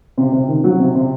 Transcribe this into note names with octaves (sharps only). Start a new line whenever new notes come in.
C3
C3
D#3
F#3
C3
C3